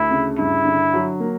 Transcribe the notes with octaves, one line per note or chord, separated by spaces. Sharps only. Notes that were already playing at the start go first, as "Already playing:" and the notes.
Already playing: D2 E4
C#3
G2 E4
D3
F#3
A#3